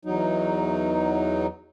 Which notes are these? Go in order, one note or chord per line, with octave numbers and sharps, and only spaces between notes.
E2 F#3 D#4